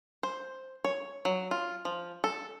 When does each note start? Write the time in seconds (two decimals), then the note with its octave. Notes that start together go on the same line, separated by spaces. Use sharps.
0.23 C5
0.84 C#5
1.25 F#3
1.51 F4
1.85 F3
2.24 A4